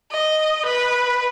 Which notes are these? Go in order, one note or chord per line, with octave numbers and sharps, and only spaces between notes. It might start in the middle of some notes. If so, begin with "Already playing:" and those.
D#5
B4